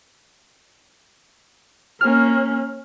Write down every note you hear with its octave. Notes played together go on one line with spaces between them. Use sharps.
A#3 C#4 F6